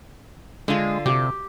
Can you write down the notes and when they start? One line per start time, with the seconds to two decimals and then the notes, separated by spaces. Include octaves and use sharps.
0.68 D3 G#3 F4
1.06 C3 G4